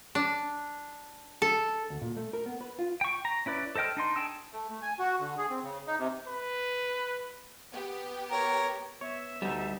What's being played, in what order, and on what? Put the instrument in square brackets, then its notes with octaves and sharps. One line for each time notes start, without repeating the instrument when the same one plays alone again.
[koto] D4
A4
[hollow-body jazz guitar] D2
A#2
A3
A#4
B3
B4
F4
[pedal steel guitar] G5 C#6
A#5
C#4 E4 B4 D5
A4 C5 D#5 G5 F6
D4 D#4 C6
G#4 G5 A5 E6
[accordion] A3
A3
G#5
F#4
D3
G#4
C4
C#3
D#4
C3
[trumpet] B4
[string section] B3 G4
[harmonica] A#4 [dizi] C#5
[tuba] B3 [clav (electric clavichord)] C#5 [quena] E5
[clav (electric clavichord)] D2 D#4 [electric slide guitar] G3